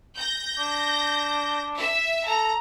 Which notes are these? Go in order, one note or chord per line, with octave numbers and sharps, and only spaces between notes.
G6 A#6
D4
E5
A4 A#5